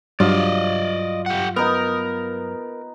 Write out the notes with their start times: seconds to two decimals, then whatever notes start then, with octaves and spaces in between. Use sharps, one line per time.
0.20 G2 F#3 F4 D5 D#5
1.26 G4 F#5
1.56 B3 D#4 A#4